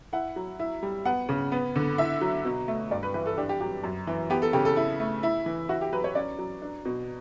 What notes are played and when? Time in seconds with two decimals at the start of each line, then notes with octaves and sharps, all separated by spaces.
0.13 E4 F#5
0.36 F#3
0.59 E4
0.82 G3
1.05 B3 F#5
1.29 C#3
1.52 B3
1.76 D3
1.98 E4 E5
2.21 F#3
2.45 B2
2.68 A3
2.91 G2 D5
3.03 B4
3.14 E3 B4
3.26 A4
3.37 D4 G4
3.49 G4
3.61 F#3 G4
3.83 F#2
4.07 E3
4.30 B3 G4
4.42 A4
4.53 C#3 G4
4.65 A4
4.77 E4
5.00 A3
5.23 E4
5.46 E3
5.69 E4 F#4
5.81 G4
5.93 F#3 B4
6.04 C#5
6.15 C#4 D5
6.38 F#3
6.62 D4
6.85 B2